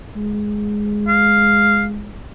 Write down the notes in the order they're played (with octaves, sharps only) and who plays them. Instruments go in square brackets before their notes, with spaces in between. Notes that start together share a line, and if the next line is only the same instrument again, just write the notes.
[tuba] G#3
[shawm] F5